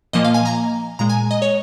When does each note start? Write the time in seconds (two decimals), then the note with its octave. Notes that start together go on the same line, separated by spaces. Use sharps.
0.13 A#2 F3 A#3 D#5
0.24 F5
0.34 G#5
0.45 A#5
0.99 A#2 G#3 A#5
1.10 G#5
1.31 D#5
1.42 C#5